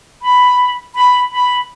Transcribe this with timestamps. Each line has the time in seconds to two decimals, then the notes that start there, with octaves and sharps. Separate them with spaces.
0.22 B5
0.95 B5
1.32 B5